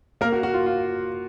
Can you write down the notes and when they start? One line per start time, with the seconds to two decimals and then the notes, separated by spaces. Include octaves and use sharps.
0.21 A#3 A#4
0.32 F#4
0.43 F#4
0.54 F4
0.66 F4